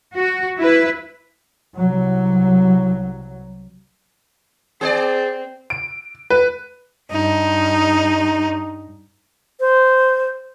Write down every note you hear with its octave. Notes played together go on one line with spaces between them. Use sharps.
F#4
E4 B4
C2 F#3
C4 G#4 C5 D5
D7
B4
G2 D#4
C5